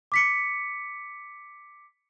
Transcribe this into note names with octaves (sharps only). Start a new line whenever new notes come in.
D6 B6 C#7